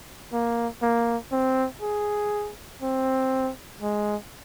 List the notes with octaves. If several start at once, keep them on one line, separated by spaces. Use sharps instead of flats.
A#3
A#3
C4
G#4
C4
G#3